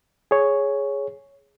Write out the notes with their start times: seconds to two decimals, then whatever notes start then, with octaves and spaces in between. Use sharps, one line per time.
0.31 G#4 C#5